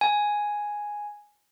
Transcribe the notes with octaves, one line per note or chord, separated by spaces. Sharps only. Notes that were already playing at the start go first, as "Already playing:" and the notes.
G#5